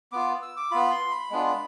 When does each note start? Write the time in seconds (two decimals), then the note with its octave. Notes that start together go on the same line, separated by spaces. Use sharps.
0.12 B3 F4 D6
0.42 E6
0.57 D6
0.71 B3 F4 B5
0.91 C6
1.11 B5
1.31 G#3 B3 D4 F4